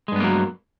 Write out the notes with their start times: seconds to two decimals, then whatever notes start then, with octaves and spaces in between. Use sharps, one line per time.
0.08 G#3
0.12 G2
0.16 B3
0.20 A#3
0.24 F#3